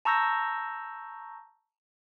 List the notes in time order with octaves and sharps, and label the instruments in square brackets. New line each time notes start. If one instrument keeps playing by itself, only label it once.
[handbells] A5 A#5 C#6 E6 G6 A#6